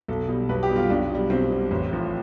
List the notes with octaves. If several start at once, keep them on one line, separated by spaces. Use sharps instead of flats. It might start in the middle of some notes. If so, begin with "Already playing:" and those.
B1 A4
B2 G3
B1 B4
G4
B2 G3
F4
B1 D4
B2 G3
B1 C4
B2 G3
A1
A2 F3